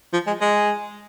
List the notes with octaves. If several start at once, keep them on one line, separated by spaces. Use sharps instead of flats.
F3
G#3
G#3